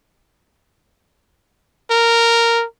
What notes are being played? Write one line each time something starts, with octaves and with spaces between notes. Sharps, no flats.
A#4